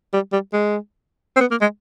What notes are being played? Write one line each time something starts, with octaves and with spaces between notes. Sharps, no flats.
G3
G3
G#3
C4
B3
A#3
G#3